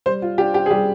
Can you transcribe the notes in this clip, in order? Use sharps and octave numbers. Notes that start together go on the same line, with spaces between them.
G3 C5
F4
D4 F4 G4
G4
G#4
G3 G4